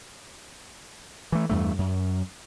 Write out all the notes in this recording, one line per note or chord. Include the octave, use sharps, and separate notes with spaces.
E3 A3
E2 G2 A3
F#2